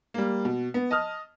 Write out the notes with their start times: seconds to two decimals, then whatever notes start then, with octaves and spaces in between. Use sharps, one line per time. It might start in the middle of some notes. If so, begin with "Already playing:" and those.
0.14 G3 A#3
0.45 B2
0.74 B3
0.91 D#5 A5 D#6 F6